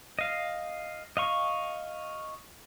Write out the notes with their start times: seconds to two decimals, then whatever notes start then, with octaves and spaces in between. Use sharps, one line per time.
0.19 D#5 F5
1.17 D#5 F5 C#6